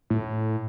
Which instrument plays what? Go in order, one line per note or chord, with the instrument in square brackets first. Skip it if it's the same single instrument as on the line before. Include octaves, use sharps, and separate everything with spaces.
[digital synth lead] A2